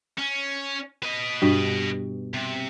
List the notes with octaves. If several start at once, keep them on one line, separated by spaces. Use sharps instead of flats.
C#4
B4 D#5
G2 B2
C3